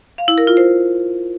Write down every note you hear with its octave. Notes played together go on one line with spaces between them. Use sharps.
F5
E4
A#4
F4
C5